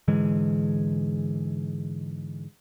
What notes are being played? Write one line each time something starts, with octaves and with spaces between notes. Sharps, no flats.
G#2 D3 E3 G#3